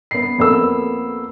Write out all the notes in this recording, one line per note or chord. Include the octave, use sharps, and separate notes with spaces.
B3 C7
F2 A#3 B3 A4 E6